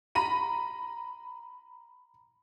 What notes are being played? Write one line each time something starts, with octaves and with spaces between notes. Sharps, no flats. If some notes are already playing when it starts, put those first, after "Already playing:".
A#5 B5 D#7